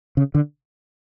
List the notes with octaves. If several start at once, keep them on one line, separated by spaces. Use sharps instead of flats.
C#3
D3